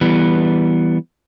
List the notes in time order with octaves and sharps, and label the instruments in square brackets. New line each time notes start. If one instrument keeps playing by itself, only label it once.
[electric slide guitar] E3 G3 B3